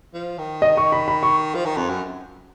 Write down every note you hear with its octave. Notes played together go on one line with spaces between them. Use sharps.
F3
D#3
D#5
C#6
B5
B5
C#6
F3
D#3
F2
F#2